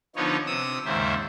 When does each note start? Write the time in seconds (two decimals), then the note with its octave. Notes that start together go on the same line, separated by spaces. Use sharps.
0.16 D3 F3 B3 D#4 C#5
0.47 C3 D#6 E6
0.85 D#2 G#2 C#3 C5 E5